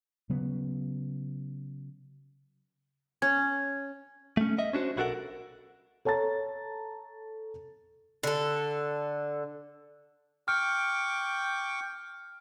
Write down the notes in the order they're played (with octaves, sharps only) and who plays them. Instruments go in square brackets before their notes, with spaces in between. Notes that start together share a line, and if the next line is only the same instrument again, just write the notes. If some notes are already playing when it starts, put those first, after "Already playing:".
[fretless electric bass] C#3 F#3 B3
[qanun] C#4 [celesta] G#6
[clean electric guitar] A3 C#4
D#5 E5
C#4 D4 F#4 C5
B1 E4 F#4 A4 A#4 F#5
[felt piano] A4 C#5 A5 A#5 A6
[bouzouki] D3 A4
[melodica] G5 C#6 D6 [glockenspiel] F6